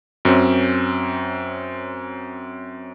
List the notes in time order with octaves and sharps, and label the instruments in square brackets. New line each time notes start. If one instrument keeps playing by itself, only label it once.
[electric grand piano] F#2 C4 C#4